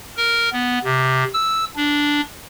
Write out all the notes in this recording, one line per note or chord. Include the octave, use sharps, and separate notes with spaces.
A#4
B3
C3
E6
D4